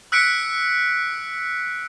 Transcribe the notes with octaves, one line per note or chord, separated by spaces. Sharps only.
E6 F#6 B6 C#7 D7